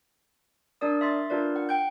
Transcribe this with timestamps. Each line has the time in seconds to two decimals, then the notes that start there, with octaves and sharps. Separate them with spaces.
0.81 D4 A#4 D5 D#6
1.01 E5 C6 A6
1.30 D4 F4 A#4 B4 D5
1.56 F#5
1.69 G5 G6